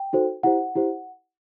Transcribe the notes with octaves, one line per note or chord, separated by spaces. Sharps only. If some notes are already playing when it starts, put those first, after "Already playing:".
Already playing: G5
D#4 F#4 A4 C5
E4 G4 C5 F#5
E4 G4 C5